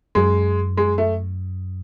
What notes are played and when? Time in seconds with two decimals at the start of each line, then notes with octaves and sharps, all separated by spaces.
0.15 F#2 G#3
0.77 G#3
0.98 A3